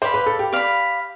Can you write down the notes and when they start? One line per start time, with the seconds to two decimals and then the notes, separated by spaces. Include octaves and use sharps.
0.02 C5 D5 F5 B5
0.14 B4
0.26 A4
0.39 G4
0.53 D5 F5 B5